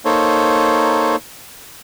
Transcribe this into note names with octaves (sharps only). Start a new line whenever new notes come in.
A#3 D#4 A4 C5 C#5